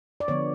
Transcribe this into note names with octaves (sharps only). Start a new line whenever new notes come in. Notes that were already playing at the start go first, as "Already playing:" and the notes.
D5
D3 F3 B3 C#5